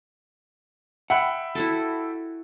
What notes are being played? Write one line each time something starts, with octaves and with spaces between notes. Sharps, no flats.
E5 F#5 G5 B5
E4 F#4 A4